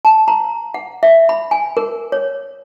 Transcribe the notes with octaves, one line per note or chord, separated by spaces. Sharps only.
A5
A#5
F#5
E5
B5
G#5
A#4
C#5